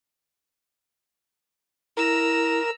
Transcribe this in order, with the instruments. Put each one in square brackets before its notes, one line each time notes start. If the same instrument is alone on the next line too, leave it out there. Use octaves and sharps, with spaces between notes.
[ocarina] E4 [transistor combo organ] A#4 [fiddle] A#5 E6